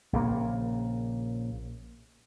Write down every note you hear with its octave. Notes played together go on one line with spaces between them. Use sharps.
A#1 C#3 A#3